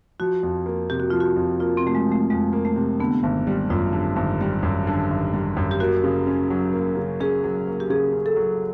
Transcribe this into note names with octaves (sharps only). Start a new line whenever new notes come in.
F3 F#4
F2
A#3
C3 G4
F#4
F3 F4
F#4
F2
A#3 F4
C4
C3 A3
G#3
F3 A3
F2 G#3
A#3
A3
C3
D3 B3
G#1
G3
F#2 F4
D3
G#1
G3
F#2
D3
G#1
G3
F#2
G4
A#3 F#4
C#3
C#4
F#3
A#3
C#3
C#4 G#4
F#3
A#3
G4
C#3 G#4
C#4
A4
F#3